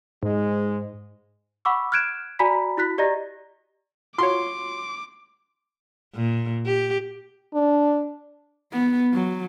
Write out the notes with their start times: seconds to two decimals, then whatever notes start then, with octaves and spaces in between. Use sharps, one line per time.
0.23 G#2 G#3
1.65 F#5 B5 C#6 D6 E6
1.92 F6 F#6 G#6 D7 E7
2.39 F#4 D5 G#5 A#5 B5 B6
2.77 E4 F#4 F#6 B6
2.98 G4 D5 D#5 A#5 A#6
4.18 F4 F#4 C#5 C6 D6
6.15 A#2
6.66 G4
7.54 D4
8.72 B3
9.13 F#3